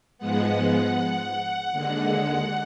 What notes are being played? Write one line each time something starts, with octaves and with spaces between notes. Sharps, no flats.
G#2 F3 G#3 B3 F#5
D#2 D3 G#3